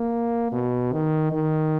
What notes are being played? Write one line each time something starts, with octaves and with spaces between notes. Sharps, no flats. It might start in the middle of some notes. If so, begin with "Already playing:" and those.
Already playing: A#3
B2
D#3
D#3